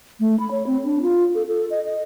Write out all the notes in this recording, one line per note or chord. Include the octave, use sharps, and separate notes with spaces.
A3
B5
C#5
C4
D4
F4
A4
A4
D#5
D#5